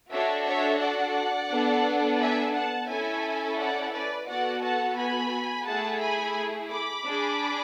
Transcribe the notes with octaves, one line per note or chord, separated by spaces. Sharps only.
D4 F#4 A4 C#5 E5
C#5 E5
D5 F#5
B3 D4 A4
E5 G#5
F#5 A5
C#4 E4 A4 E5 G#5
D5 F#5
B4 D5
B3 F#4 A4 D5 F#5
F#5 A5
G#5 B5
A3 E4 G#4 F#5 A5
G#5 B5
B5 D6
D4 G#4